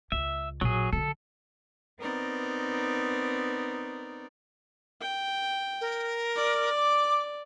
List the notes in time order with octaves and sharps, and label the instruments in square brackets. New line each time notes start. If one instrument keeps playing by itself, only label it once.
[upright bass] C#2 [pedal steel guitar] E5
[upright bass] A#1 [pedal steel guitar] F#3 G#4
[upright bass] D3 F#3 [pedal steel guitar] A4
[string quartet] B3 C4 D#4 A#4 D5
[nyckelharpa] G5
[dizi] A#4
[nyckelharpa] D5
[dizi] D6